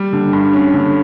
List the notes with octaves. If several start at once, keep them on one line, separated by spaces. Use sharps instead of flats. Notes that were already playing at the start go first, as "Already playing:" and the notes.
Already playing: G3
D3
G2
C#4
D3